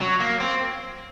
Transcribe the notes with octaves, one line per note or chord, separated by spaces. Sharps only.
F#3
A#3
C4